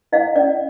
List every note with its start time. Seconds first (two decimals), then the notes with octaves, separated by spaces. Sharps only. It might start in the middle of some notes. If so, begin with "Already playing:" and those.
0.12 E4 D#5 F5
0.36 C#4 D5